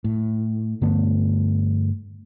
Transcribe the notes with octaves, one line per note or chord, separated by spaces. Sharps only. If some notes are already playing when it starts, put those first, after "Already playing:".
A2
G2 D3 A3 B3